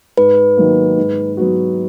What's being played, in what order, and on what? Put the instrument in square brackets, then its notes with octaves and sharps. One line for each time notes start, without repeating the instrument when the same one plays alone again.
[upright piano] G#2 [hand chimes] B4
[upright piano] D#3 F#3 A#3
G#2
F#3 B3 F#4